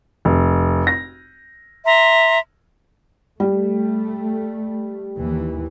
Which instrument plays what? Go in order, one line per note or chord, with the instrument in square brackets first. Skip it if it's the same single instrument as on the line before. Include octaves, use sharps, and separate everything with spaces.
[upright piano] F1
A#6
[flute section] E5 A#5 C6
[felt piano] G3 [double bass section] A3
[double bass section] D#2 E3